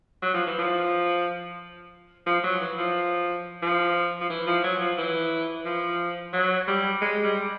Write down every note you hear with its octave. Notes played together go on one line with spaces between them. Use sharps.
F#3
F3
E3
F3
F3
F#3
E3
F3
F3
F3
E3
F3
F#3
F3
E3
F3
F#3
G3
G#3
G3